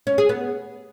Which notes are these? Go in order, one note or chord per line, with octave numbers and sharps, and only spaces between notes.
C#4
G#4
B3